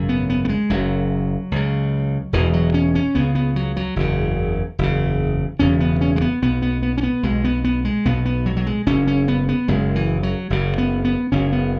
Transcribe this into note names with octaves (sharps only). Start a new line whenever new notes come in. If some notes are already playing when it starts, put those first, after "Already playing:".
Already playing: G#1 F#2 C#3
B3
B3
B3
G#3
F#1 F#2 C#3 F#3
C#2 C#3
E1 E2 B2 E3
F#3
C#4
C#4
C#2 C#3 B3
B3
F#3
F#3
F#1 E2 C#3
F#1 E2 C#3
E1 E2 C#3 C#4
B3
C#4
G#3
B3
B1 B2 B3
B3
B3
C#4
B3
B1 B2 G#3
B3
B3
G#3
B1 B2 B3
B3
F#3
F#3
G#3
F#1 F#2 C#3 C#4
C#4
B3
B3
F#1 F#2 C#3 G#3
E3
F#3
F#1 F#2 C#3
B3
B3
F#1 F#2 C#3 C#4
B3